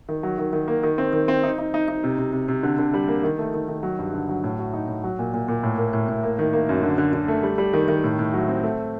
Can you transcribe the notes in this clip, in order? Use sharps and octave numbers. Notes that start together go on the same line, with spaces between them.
D#3
F#3
D#3
D#3
A#3
D#3
C4
D#3
C4
D#4
D#4
D#4
D#4
C3
C3
C3
C3
D3
D3
G3
A#3
D#3
A3
D#3
D#3
F#3
G2
D3
F#3
A2
F#4
D#4
A2
F#3
A#2
A#2
A#2
A2
A#3
A2
A2
A#3
D#3
A#3
F#2
D3
D3
D3
A3
G3
G3
D#3
D#3
A2
A2
F#3
C4
A3